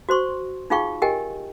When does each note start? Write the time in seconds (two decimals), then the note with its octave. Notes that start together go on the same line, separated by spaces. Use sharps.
0.09 F#4 C5 C6 C#6
0.70 D#4 F4 G#4 F5 G5 C#6
1.02 G4 A#4 D#5 G5 G#5